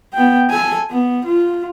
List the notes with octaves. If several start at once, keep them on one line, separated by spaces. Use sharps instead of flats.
B3 G5
A4 G#5
B3
F4